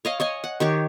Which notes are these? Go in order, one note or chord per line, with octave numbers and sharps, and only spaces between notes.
C#5 D#5 F5
C#5 D#5 G#5
F#5
D#3 G4 C#5